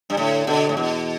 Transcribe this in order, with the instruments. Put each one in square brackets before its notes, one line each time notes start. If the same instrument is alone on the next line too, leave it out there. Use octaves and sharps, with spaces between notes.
[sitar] G2
[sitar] A2 [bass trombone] D3
[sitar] B2 [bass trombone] D3
[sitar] A2
[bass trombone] E2 [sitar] B2